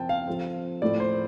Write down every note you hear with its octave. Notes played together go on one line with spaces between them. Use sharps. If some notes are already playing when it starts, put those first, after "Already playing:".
Already playing: F3 C4 G5 A5
F5
F3 C4 A4 C5
A2 F3 A3 D5
C5